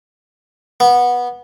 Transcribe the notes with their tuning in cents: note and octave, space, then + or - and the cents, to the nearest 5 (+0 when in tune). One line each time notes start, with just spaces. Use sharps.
B3 -15